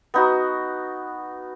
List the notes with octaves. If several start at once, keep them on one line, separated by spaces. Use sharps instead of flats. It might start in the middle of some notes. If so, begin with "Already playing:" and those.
B3 D#4 F#4